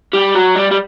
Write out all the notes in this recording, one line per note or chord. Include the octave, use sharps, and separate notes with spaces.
G3
F#3
G3
G3